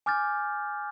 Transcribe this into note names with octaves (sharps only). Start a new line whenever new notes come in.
G#5 D6 F6 G6 A6